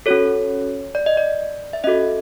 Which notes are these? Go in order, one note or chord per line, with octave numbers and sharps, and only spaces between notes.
C#4 F#4 A4 C#5
D5
D#5
D5
E5
C#4 F#4 A4 D#5